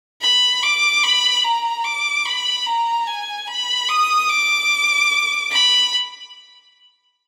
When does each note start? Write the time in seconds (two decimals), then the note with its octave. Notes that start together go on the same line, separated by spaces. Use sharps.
0.21 B5
0.63 D6
1.03 B5
1.44 A#5
1.84 D6
2.25 B5
2.66 A#5
3.07 G#5
3.48 B5
3.88 D#6
4.29 D6
5.51 B5